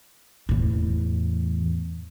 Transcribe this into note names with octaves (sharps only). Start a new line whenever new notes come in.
E2 A2